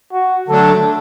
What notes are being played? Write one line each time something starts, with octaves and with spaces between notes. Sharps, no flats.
F#4
D3 F#3 A3 D4 A4